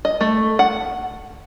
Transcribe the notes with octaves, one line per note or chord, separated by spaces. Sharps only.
D#5
A3
F#5